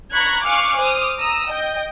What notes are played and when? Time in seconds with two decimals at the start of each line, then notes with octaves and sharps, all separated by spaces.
0.12 A#5 B5 C#6 F#6 G#6
0.44 F5 G#5 C#6 D6 F6 F#6
0.80 C5 D6 D#6 F6
1.18 A#5 D#6 E6
1.48 D#5 G5 G6